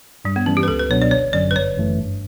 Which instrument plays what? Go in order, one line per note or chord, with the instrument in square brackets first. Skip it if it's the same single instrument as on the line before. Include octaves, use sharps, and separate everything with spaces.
[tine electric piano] G2 [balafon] G3
[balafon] B3
[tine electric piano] E3 G3 [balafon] C#4
[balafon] G4
B4
[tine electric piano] C#2 [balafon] A4
[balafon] B4
[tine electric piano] B2 F#3 B3 D4 [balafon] C#5
[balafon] D5
[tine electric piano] G1 [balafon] C#5
[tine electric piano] F#2 D3 F#3 C#4 [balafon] D5
[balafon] B4
[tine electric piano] G1 [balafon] C#5
[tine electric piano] F#2 E3 A3
G2